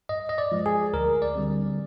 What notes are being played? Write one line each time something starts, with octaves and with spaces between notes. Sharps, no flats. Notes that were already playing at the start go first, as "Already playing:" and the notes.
G2 D#5
D#5
D5
F3 G#3
G#4
D2 A#4
D5
D3 G3 C4